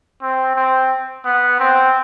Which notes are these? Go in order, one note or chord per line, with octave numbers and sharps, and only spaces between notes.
C4
C4
B3
C4